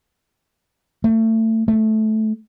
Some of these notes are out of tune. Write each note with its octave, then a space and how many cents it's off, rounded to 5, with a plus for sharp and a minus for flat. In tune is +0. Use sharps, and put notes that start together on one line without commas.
A3 +25
A3 -15